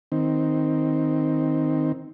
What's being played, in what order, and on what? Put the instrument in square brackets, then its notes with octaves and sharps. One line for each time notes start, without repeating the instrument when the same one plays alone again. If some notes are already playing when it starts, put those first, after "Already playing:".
[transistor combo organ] D#3 C4